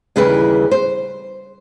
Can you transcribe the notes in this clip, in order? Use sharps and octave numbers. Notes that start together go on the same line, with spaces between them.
D#2 C#3 E3 G3 E4 B4
C5